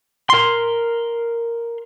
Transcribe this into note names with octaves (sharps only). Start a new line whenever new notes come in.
A#4 C6